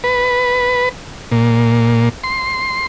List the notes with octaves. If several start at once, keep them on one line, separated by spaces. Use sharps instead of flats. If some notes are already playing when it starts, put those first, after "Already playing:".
B4
A#2
C6